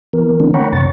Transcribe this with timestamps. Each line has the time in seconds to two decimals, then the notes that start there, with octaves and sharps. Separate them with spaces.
0.13 E3 B3 A#4
0.40 D3 E3 A3 B3 C4 D4
0.54 C#5 F#5 G5 A#5 B5 C#6
0.73 F#2 C3 C#6 A6